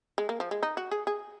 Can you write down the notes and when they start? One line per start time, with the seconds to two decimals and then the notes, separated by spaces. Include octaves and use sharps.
0.18 G#3
0.29 A#3
0.40 F3
0.51 G#3
0.63 D#4
0.77 F#4
0.91 G#4
1.07 G#4